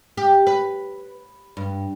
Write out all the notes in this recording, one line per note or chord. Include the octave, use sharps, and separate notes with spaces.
G4
B4
G2